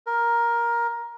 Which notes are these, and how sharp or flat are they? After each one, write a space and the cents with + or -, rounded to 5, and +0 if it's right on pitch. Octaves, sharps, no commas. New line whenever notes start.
A#4 +10